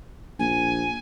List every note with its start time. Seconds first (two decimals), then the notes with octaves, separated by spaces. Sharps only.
0.39 A#1 G#5